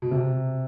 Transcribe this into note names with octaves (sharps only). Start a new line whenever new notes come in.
B2
C3